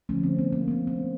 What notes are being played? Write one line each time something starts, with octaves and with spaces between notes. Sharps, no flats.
D3 F3 A3 C#4
C4
B3
A#3
D3 F3 A3 B3
C4